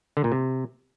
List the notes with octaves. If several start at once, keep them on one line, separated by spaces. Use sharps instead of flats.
D3
A#2
C3